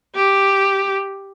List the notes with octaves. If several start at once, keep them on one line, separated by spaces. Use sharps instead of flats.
G4